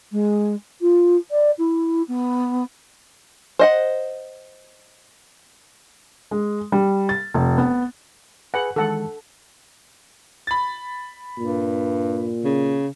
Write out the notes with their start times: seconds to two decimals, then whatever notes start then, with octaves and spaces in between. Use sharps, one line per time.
0.12 G#3
0.81 F4
1.31 D5
1.58 E4
2.08 B3
3.59 C5 D#5 F#5
6.31 G#3
6.72 G3
7.09 A6
7.34 F1
7.58 B3
8.54 G#4 B4 F#5 G#5
8.76 D#3 E3 G#3 A4 F#5
10.47 B5 A6
11.38 G2 A#2
12.44 C#3